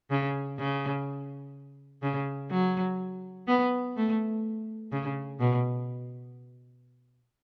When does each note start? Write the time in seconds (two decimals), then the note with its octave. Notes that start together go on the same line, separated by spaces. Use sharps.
0.11 C#3
0.59 C#3
2.03 C#3
2.51 F#3
3.48 B3
3.97 A3
4.92 C#3
5.40 B2